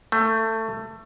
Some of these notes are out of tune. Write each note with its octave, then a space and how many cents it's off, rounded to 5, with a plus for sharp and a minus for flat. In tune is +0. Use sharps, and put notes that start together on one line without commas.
A3 +20